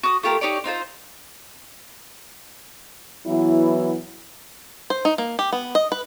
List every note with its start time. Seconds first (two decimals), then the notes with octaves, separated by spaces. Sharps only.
0.03 F#4 D#6
0.23 A3 F4 G4 A#4
0.41 D#4 G4 C#5 D5
0.64 C4 D#4 F4 C5
3.26 E3 F#3 B3 E4
4.90 C5
5.05 D#4
5.18 A#3
5.39 G4
5.53 B3
5.75 D#5
5.92 B4